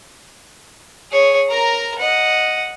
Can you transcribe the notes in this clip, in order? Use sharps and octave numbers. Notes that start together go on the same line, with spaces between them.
G#4 C#5
A#4 A#5
D#5 F#5